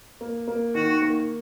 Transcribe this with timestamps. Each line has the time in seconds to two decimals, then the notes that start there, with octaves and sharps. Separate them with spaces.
0.21 A#3
0.48 A#3
0.75 D#3 F#4
1.02 A#3